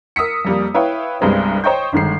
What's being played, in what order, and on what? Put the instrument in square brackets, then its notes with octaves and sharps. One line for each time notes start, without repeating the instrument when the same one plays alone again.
[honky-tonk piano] A#4 D#6 E6 B6 C#7
F2 G3 A#3
E4 B4 C#5 F5 G5
C2 G2 G3 G#3 B3 C4
C5 C#5 D#5 G5 C#6 G6
G1 D#3 G#3 C7